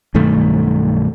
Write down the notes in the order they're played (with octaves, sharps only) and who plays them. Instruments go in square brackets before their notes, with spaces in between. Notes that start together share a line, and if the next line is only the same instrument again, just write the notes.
[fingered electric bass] B1 G2 D#3 A3